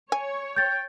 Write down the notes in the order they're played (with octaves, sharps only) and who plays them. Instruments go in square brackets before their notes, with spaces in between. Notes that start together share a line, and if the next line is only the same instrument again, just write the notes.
[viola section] C#5 [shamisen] G#5
[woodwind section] G5 [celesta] G6 A6